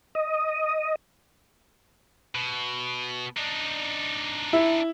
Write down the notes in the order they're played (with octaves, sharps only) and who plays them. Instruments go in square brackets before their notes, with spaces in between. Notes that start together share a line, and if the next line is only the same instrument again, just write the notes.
[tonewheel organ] D#5
[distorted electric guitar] B2
D4 D#4
[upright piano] E4